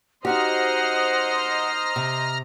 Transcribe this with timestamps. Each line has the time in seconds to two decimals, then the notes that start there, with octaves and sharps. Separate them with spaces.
0.25 D#4 F#4 G4 C5 D#5 F#5 A#5 F6
1.96 C3